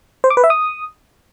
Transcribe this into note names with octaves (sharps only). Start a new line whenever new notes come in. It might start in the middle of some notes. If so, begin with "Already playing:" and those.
C5
D6
B4
E5
D#6